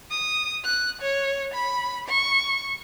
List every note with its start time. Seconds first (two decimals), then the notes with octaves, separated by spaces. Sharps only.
0.11 D#6
0.64 F#6
1.02 C#5
1.54 B5
2.09 C#6